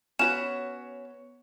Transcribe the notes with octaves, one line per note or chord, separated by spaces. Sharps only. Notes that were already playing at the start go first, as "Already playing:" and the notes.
B3 C#4 F#4 B4 C#5 E7